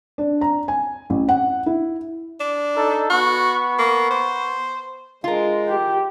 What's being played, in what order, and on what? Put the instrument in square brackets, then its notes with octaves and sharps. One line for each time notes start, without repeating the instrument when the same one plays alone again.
[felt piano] D4
A#5
G#5
A1
F#5
E4
[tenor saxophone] D4
[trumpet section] D#4 A4
[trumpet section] B3 C#6 [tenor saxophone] F#4
[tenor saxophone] A#3
C5
[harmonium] G#3 [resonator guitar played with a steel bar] F4 A#4
[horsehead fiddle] G4